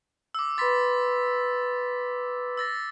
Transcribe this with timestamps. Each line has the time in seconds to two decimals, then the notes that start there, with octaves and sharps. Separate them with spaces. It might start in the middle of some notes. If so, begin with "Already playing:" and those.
0.35 D6 E6
0.58 B4 B5 C6 A6 B6
2.57 E6 A6 A#6